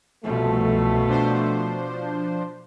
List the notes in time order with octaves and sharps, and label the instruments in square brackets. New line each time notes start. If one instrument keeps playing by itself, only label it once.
[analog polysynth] C2 F#2 F3 [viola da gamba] B2 [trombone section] A3
[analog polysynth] F3 D4 C5